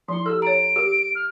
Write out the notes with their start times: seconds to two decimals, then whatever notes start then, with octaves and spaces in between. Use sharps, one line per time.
0.09 F3 E4 C6
0.26 G4 A4 E6
0.42 C#5 A#5 D7
0.76 G4 A#4
1.15 F6